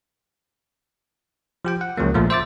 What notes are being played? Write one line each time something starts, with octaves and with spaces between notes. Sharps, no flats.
F3 G4 G5
F#5
C#2 C#3 F3 F#3 A#3
A#1 A#2 F3 A3
C5 E5 D6 A6